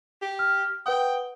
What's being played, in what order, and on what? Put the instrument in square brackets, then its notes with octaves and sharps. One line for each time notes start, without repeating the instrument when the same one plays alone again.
[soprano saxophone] G4
[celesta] F6
[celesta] B4 F#5 D#6 [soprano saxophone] G5